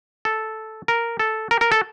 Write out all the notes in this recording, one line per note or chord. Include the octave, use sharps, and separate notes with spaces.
A4
A#4
A4
A#4
A#4
A4